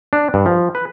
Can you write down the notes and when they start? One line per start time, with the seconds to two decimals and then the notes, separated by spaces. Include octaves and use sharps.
0.13 D4
0.34 G2
0.46 F3
0.75 B4